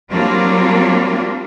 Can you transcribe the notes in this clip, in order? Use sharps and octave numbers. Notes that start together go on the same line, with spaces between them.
F#3 G3 A#3 C4 D4 F4